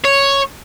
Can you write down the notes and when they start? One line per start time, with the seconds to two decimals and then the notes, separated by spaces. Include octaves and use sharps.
0.04 C#5